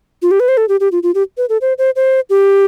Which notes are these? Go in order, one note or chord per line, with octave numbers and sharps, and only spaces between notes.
F4
G4
B4
C5
A4
G4
G4
F4
F4
G4
B4
A4
C5
C5
C5
G4